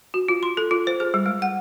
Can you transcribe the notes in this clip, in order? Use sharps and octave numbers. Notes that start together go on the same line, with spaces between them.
F#4
F4
C6
A4
F4
C5
G#4
G3
G#3
F#5